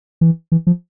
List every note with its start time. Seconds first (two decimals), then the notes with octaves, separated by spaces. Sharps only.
0.21 E3
0.52 E3
0.67 F3